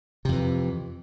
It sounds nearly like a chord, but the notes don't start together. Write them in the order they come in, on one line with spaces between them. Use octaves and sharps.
C3 F2 E3